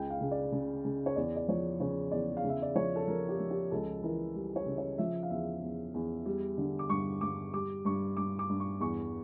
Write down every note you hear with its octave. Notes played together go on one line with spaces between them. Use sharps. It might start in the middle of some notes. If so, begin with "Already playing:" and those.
Already playing: C#2 G5
F5
C#3
D5
C#3
C#3
C#5
E2 D5
D5
F3 C#5
C#3 C#5
E2 D5
F5
C#3 E5
D5
F3 C#5
A4
F3 A#4
G4
F3
G4
C#2 A4
E3 A#4
G3
C#5
C#3
C#5
F3 E5
F5
E2 E5
E2
E2
G3
D3
D6
G2 C#6
G2 D6
G3 D6
G2 C#6
G2 D6
D6
G2
C#6
E2 C#6